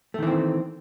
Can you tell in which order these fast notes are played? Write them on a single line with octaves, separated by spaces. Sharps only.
A3 D#3 E3 C4